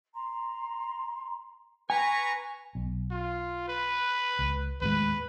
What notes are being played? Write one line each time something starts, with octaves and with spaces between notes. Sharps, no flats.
A#5 C6
B4 G#5 A#5 C#6
B1
F4
B4
C#2
D#2 A2 G#3 B4